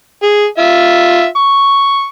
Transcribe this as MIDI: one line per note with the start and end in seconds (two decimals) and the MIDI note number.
0.23 0.45 68
0.58 1.25 65
0.58 1.25 76
1.36 2.06 85